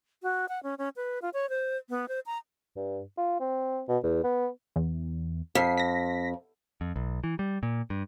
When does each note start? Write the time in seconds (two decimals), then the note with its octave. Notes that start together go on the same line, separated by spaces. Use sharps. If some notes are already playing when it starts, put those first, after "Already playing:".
0.22 F#4
0.49 F#5
0.63 C#4
0.78 C#4
0.96 B4
1.22 F4
1.33 C#5
1.49 C5
1.89 B3
2.08 C5
2.26 A#5
2.76 G2
3.18 F4
3.40 C4
3.88 B2
4.04 E2
4.24 B3
4.76 E2
5.55 F2 B6 C7
5.77 A#6 B6
6.81 F2
6.96 B1
7.24 E3
7.39 G3
7.63 A#2
7.90 G2